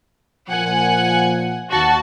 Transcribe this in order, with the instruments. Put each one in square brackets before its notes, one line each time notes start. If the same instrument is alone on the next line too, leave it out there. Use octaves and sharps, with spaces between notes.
[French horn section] A#2 F3 [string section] F#5 G#5
[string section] D#2 F#4 A5